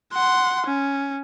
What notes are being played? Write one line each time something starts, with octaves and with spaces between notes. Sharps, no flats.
F#5 C6
C#4